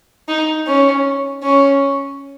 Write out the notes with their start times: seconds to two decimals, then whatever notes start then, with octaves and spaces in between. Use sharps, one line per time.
0.28 D#4
0.67 C#4
1.43 C#4